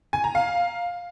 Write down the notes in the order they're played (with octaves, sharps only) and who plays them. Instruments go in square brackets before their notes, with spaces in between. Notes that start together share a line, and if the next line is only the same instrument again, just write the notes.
[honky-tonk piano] G#5
A#5
F5